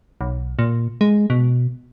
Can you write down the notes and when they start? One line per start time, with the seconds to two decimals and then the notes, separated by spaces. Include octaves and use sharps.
0.21 B1
0.59 A#2
1.01 G#3
1.30 B2